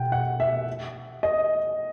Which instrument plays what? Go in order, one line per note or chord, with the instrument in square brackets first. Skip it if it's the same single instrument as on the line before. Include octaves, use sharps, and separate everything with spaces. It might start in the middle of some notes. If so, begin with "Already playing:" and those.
Already playing: [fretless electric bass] B2 [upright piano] F#5 G5
[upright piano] F#5
E5
D#5